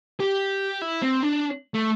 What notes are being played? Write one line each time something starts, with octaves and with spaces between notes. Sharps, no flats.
G4
E4
C4
D4
A3